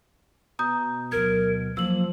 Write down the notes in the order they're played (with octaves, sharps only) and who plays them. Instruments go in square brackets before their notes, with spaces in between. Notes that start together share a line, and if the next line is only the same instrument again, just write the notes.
[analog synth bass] B2 [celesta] A#5 D#6 G6
[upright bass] D2 F#3 [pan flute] A#4 [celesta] G#6
[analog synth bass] F3 [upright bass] F#3 [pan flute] A#3 [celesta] E6 F#7